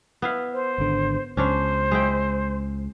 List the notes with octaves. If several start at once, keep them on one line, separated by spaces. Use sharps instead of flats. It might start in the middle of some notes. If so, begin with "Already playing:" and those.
B3 E4 F5
C5
G#1 D3
C#2 C#4 D4 C5 C#5
G#3 E4 G5